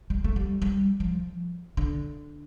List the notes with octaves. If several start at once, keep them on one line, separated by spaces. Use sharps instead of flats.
G3
A3
G3
G3
F3
D3